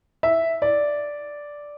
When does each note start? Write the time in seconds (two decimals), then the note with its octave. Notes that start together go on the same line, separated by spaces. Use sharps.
0.23 E5
0.62 D5